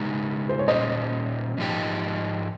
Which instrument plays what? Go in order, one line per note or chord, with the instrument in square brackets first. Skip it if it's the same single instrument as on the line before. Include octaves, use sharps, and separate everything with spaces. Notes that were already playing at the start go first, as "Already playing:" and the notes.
Already playing: [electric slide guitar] C#3 G#3 D#4 G4
[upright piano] C5
C#5
[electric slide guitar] A#2 G3 C#4 [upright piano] C5 D#5
[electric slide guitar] G#2 F3 G#3 D#4 G4